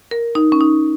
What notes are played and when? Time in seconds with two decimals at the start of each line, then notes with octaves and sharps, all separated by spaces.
0.11 A#4
0.35 D#4
0.52 C#4
0.61 D#4